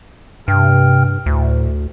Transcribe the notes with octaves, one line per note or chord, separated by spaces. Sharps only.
G2 C3 G5 F6
D2 A2